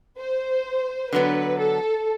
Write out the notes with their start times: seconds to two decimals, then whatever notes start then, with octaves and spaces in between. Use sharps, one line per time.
0.19 C5
1.13 D3 F#3 B3 B4
1.59 A4